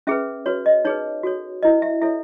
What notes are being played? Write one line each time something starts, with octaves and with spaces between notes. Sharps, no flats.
C#4 G#4 B4 E5
F#4 B4 C#5
D#5
D#4 G#4 B4 C#5
F#4 A4 C#5
E4 B4 D#5
E5
E4 A4 C#5 E5